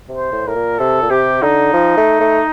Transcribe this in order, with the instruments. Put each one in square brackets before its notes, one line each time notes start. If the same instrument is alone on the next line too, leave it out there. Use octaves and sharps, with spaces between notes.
[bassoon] C3
[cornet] C5
[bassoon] A2
[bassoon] A2 [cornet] A#4
[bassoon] A#2
[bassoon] C3 [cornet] A4
[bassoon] A#2
[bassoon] C3 [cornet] G4
[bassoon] D3 [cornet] D#4
[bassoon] F3
A3
A3